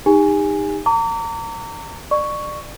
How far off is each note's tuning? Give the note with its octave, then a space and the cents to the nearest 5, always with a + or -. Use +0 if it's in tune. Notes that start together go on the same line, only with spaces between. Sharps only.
D#4 +0 G4 +40 G#5 +0
A#5 -35 D6 -40
D5 +30 C#6 +5